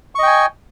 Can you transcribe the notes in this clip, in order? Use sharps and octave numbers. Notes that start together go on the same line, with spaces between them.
D#5 G5 G#5 C#6